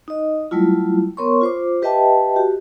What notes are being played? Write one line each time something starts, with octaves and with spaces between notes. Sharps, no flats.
D#4 D#5
F#3 G3 A3 E4 F4
B3 A#4 C#5 C6 C#6
F4 C5 D6
G4 B4 D#5 E5 G5 A5
F#4 G4